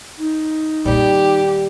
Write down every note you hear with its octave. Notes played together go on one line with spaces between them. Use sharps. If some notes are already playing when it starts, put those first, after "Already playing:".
D#4
A#2 D#3 G3 G4